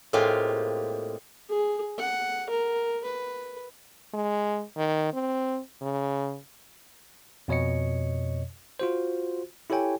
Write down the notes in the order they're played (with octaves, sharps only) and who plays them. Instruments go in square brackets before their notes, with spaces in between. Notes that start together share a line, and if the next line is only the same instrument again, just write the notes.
[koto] A2 G#3 A#3 C4 F4 G4
[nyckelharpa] G#4
F#5
A#4
B4
[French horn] G#3
D#3
C4
C#3
[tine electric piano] F2 B2 C#5 D#5 C#7
F4 F#4 C5
E4 G4 A4 C#5 G5 G#5